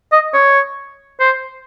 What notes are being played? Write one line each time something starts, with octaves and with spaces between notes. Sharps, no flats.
D#5
C#5
C5